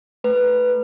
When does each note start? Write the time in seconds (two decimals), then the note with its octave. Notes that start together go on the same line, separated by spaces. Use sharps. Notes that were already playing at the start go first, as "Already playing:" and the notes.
0.24 A3 B4